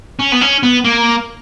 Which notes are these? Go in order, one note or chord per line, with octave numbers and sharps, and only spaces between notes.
C#4
B3
C#4
B3
A#3